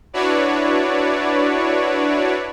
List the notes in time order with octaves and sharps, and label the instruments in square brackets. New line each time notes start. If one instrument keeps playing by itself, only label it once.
[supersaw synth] D4 E4 F#4 B4 C#5 D5